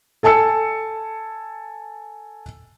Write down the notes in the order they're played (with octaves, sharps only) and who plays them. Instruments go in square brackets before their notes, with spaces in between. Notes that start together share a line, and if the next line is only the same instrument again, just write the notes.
[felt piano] A4 G#5 A5 E6 C#7